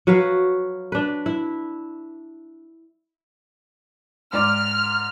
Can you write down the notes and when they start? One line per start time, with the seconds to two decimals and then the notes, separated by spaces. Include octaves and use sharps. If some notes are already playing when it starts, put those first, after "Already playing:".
0.07 F#3 F#4 B4 F5
0.92 D4 B4
1.26 E4
4.33 G#2 D5 D6 F6